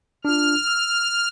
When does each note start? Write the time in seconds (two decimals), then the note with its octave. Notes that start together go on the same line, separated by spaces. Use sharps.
0.25 D4 F4 F6
0.68 E6